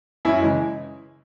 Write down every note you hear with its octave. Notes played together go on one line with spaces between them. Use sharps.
F#2 E4
C#3 E3 G#3